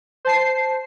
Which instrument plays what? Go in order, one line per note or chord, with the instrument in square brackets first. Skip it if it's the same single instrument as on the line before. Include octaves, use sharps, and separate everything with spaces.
[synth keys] C5 A5 C7